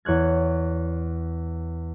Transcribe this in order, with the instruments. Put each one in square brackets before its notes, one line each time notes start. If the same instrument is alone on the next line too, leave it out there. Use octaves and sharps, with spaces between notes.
[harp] E2 C#5 F#6 G#6